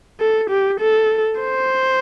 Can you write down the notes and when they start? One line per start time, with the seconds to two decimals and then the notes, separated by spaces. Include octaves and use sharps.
0.20 A4
0.50 G4
0.80 A4
1.41 C5